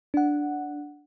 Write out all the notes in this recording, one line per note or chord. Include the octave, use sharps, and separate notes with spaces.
D4 F#5